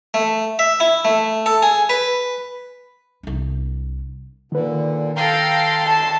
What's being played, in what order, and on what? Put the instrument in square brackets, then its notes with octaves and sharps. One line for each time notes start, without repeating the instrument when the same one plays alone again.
[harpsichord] A3
E5
E4
A3
A4
G#4
B4
[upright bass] C2 D4
[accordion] A#2 D3 [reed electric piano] D#3 B4
[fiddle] A4 C6 [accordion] F5 G5 A#5
[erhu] A5